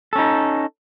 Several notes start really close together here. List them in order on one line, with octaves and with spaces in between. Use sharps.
A4 C#4 D#4